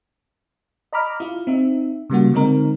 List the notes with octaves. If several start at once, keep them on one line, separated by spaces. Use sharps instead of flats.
D#5 A#5 B5 D6 F6
E4 F4
C4 D#4 E5
C#3 G3 A#3 F#4
D3 G#3 C4 D#4 A#4